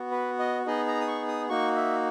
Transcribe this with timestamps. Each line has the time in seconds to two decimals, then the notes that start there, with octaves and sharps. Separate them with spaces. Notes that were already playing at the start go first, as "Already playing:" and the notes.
Already playing: B3 F#4
0.11 B4
0.39 D#5
0.66 B3 D#4 G#4 D#5
0.87 A#5
1.01 D#6
1.08 C#6
1.28 D#6
1.49 A#3 D#4 F#4 C#6
1.76 E5